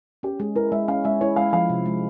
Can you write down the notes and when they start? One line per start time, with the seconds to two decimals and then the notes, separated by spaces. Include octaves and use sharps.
0.23 C#4 G4
0.40 G#3 G#4
0.56 E4 A#4
0.72 G#3 E5
0.88 C#4 F5
1.05 G#3 E5
1.21 E4 C#5
1.36 G#3 F5
1.53 F3 F5
1.70 C3
1.86 G#3